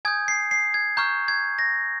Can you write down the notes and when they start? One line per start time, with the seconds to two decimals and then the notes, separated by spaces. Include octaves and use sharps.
0.05 G#5 D#6 G6 G#6
0.28 C7
0.51 C7
0.74 G#6
0.97 A#5 C#6 F6 G6
1.28 G#6
1.59 A#6